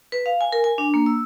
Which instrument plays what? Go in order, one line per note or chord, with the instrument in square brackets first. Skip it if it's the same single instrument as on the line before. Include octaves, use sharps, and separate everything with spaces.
[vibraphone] B4
F5
G#5
A#4
G#5
D4
A#3
E6